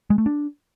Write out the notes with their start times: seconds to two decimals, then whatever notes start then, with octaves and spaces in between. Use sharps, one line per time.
0.10 G#3
0.18 A3
0.26 D4